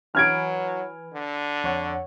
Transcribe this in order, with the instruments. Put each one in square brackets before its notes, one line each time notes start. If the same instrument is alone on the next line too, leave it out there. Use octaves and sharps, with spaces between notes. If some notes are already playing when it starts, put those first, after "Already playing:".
[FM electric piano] E3 B4 G#5 [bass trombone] F#3 [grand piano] F6 G#6 D7
[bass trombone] D3
[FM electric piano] F2 C#5 F#5